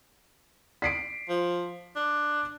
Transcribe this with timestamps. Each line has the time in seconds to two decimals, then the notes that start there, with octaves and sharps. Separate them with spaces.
0.82 B6 C7 D7
1.29 F3
1.96 D4